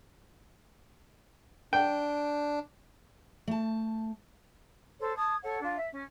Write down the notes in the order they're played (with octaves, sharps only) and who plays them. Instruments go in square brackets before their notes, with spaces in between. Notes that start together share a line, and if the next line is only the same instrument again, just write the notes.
[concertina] D4 [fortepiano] G5
[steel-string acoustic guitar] A3 A5
[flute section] A4 C5 C#5
A5 D#6 G#6
A4 C#5 F#5
D4 F4
E5
C#4